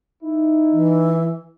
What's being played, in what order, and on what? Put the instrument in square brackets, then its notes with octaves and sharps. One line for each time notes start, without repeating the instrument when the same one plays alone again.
[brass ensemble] D#4 E4
[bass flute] E3